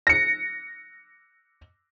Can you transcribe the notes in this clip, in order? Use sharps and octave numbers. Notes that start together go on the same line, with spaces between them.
A#6 C#7